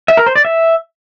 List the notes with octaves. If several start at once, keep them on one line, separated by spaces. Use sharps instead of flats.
E5
A#4
C5
D5
E5